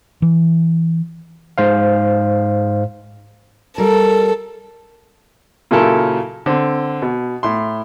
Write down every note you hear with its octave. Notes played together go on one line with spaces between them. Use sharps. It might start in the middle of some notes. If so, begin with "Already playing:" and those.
E3
G#2 C5 F5
G3 A4 A#4
A#2 C#3 F#3 E4 A4 A#4
D3 C4
B2
A2 C6